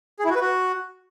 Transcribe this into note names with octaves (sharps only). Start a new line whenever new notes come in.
G#4
E4
F#4
B4
F#4